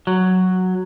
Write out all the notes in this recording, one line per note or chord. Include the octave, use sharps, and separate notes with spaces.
F#3